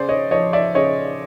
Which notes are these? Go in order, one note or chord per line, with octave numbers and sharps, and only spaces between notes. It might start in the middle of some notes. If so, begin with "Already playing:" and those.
Already playing: C#3 C5 D5
C#5 D#5
F3 C#5 D#5
D5 E5
C#3 C#5 D#5